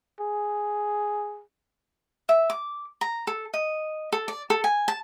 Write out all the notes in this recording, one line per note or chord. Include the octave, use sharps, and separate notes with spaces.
G#4
E5
D6
A#5
A4
D#5
A4
D5
A4
G#5
A5